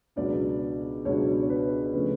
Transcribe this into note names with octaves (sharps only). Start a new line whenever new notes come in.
C#2 B2 F#3 B3 D4 D5
C#2 B2 F#3 B3 D4 C#5
C#5
B4
C#3 F3 A3 C#4 B4